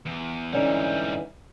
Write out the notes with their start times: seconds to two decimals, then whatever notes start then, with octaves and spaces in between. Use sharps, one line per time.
0.06 E2
0.53 G#2 D3 E3 G3 C#4 D#4